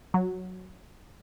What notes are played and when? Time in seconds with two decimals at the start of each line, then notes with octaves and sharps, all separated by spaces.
0.14 F#3